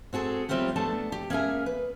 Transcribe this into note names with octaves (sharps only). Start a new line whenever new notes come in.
C4 F#4 G#4 A4
F#3 G3 C4 E4 F4 G4
A3 B3 D4 A4 A5
G4
A#3 C#4 G#4 A#4 E5 G#5
B4